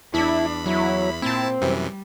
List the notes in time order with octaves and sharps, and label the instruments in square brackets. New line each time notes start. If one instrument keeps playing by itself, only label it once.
[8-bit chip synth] E2 B5 [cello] D4 [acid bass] E4
[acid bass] F#3 [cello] E4
[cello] A#2 [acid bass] C4 [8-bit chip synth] E4 A5
[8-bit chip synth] F#2 C3 E3 [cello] G3